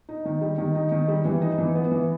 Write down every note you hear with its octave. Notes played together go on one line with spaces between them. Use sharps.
D#4
D#3
G3
D#3
D#4
D#3
G3
E3
D#4
E3
B3
E3